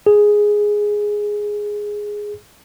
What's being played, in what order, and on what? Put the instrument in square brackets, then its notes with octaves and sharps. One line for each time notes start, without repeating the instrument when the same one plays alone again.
[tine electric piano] G#4